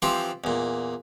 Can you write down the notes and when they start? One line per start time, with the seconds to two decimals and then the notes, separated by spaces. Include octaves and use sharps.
0.02 E3 F3 C4 G4
0.44 E2 A#2